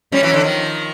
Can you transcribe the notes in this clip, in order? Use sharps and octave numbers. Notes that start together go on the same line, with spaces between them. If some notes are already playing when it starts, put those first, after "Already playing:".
F3 G3 C#4
E3 F#3
D3 E3
D#3 F3